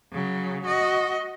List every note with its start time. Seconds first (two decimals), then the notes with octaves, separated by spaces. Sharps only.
0.12 C#3 F#3
0.66 F#4 D#5